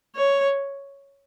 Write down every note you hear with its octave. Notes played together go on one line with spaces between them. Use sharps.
C#5